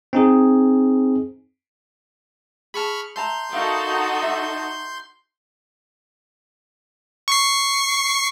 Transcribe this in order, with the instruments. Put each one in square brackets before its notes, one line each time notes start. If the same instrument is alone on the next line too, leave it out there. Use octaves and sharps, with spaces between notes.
[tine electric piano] C4 D#4 G#4
[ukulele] G#4 A5 [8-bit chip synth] B5 C#6 F6
[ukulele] E5 A5 A#5 [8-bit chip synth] C6 G6
[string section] D#4 F#4 A4 [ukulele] A#4 E5 F5
[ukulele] E5
[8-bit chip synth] C#6 C7